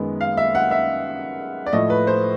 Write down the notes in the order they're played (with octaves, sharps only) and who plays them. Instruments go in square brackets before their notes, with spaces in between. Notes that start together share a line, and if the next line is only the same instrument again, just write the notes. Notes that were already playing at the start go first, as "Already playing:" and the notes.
Already playing: [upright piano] F#2 D#3 G#3 B3
F5
E5
F#5
E5
D5
A2 F3 A3 D#5
B4
C5